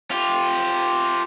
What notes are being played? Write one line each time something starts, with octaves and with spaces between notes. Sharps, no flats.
F4 G4